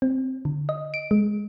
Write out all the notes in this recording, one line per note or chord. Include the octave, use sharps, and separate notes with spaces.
C4
D3
D#5
D7
G#3